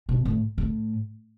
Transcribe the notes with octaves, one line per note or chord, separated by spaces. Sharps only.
B2
A2
A2